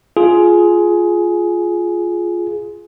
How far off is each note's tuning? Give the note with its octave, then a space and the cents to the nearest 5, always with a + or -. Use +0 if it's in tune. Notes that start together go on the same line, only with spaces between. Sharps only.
F4 +0 G#4 +15